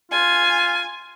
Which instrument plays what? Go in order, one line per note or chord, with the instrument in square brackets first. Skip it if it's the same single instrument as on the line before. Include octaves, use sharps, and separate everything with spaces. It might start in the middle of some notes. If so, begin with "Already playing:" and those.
[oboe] F4 [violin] G#5